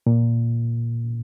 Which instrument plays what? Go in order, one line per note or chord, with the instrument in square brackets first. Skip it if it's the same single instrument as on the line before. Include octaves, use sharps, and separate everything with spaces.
[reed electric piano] A#2